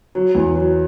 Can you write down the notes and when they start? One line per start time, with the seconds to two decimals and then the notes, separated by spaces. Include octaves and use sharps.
0.15 F#3
0.35 E2
0.55 F#3